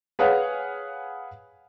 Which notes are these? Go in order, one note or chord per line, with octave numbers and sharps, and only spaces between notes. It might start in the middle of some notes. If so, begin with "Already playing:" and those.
G#4 B4 C#5 F5 F#5